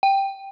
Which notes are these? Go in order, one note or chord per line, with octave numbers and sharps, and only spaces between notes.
G5